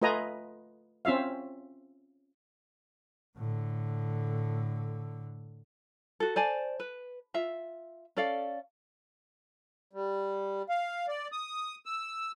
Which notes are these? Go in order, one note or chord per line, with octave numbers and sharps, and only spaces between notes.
A3 F4 B4 D#5 G#5 A#5
C4 C#4 F4 E5 F5
A2 D3
F#4 A4
C5 D5 G#5 A5
B4
F4 E5
C#4 A4 D5 F5
G3
F5
D5
D#6
E6